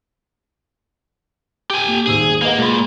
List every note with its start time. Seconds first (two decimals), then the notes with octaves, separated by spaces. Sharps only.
1.70 G4 G#5
1.87 A#3
2.07 D#1 G#1 G#4 E6
2.42 A#3 B4 D#5 F#5
2.58 A#2 G#3 B5